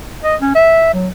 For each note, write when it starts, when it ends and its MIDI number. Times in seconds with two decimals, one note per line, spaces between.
0.24 0.36 75
0.41 0.50 61
0.55 0.89 76
0.94 1.08 54